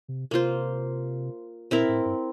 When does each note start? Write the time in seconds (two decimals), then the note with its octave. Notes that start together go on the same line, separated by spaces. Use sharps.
0.08 C3
0.31 C3 A#3 F4 C5
1.71 A#2 C4 E4 A#4
1.89 A2
2.05 G2